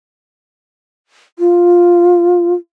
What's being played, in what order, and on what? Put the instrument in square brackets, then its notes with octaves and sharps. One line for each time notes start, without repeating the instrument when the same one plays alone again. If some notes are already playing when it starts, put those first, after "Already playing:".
[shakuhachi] F4